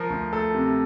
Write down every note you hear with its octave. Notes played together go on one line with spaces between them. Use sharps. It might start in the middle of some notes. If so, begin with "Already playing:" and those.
Already playing: F3 A#4
D2
A3 A4
C3